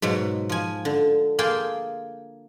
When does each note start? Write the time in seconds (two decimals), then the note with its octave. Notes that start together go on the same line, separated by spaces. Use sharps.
0.02 G#2 B2 F#3
0.49 F3 G#5
0.85 D3
1.39 A#3 G#4 G5 A5 C6